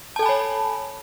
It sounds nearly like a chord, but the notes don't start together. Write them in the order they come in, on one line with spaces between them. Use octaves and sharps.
A5 A4 G#5 B5 C#5